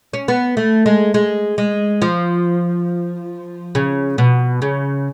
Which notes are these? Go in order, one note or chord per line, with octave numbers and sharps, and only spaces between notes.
C#4
B3
A3
G#3
G#3
G#3
F3
C#3
B2
C#3